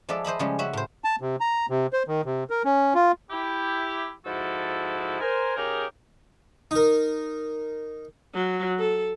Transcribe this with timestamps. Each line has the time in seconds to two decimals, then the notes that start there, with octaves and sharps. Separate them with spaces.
0.09 F3 G#3 A4 D5 E5
0.24 C5 D#5 E5 B5
0.39 C#3 F3 G3 G#3 C#4
0.59 C#4 F#4 E5
0.73 A2 C5
1.04 A5
1.21 C3
1.40 A#5
1.70 C3
1.93 C5
2.08 D#3
2.25 C3
2.50 A#4
2.65 C#4
2.94 F4
3.31 E4 G4
4.26 G#2 F3 E4 F#4 A4
5.21 A#4 C5 G#5
5.56 C#3 D#4 G4 G#4 A#4
6.71 D#4 A#4
8.35 F#3
8.79 A4